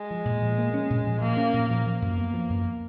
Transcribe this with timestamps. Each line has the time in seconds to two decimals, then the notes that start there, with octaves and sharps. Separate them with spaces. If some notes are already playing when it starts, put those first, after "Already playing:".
Already playing: G#3
0.11 F3
0.25 A#2
0.41 F3
0.58 A#3
0.74 C#4
0.90 A#2
1.06 F3
1.21 F3 A#3
1.37 C#4
1.54 A#2
1.69 F3 A#3
1.86 F3
2.02 F#2
2.18 B3
2.34 F3
2.50 F#2